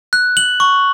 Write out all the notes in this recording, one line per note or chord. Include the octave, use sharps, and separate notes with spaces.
F#6
F#7
C#6